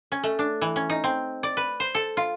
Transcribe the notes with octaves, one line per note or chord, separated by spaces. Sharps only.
C#4
A3
D4
E3
C#4
D#4
C4
D5
B4
C5
A4
F4